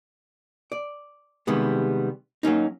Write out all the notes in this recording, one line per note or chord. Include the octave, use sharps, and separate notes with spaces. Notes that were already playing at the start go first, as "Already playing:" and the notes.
D5
C3 D#3 G3 G#3 B3
F#3 A#3 C#4 D#4